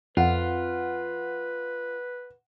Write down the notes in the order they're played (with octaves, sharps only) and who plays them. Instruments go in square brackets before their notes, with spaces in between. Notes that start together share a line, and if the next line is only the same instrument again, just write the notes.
[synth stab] F2 [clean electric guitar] F4 [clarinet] B4 [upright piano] F#5